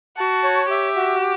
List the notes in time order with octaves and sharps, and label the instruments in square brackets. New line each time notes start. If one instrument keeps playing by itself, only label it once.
[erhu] F#4 [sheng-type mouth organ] A5
[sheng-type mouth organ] C#5
[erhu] G4 [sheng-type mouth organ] E5
[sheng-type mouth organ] F#4